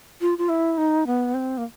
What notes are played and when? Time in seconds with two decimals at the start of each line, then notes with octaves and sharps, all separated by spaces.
0.21 F4
0.38 F4
0.49 E4
0.78 D#4
1.07 B3
1.34 C4
1.58 A#3